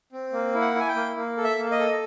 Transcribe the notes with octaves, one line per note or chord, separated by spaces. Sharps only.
C4
A#3
E4
F#5
E4 G#5
G5
A#3
A#3
A4
E5
A#3
D#5
A4